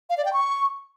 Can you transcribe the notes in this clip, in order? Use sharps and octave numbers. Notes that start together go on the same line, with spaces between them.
F5
D5
G5
C#6